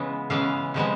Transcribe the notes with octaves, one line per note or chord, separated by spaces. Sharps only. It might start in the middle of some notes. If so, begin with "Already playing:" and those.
Already playing: C#3 E3 G#3 B3
C#3 E3 G#3 B3 F5
C3 F3 G#3 B3